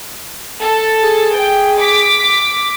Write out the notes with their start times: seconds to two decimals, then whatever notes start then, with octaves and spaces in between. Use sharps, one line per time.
0.61 A4
1.03 G#4
1.37 G5
1.79 D6 B6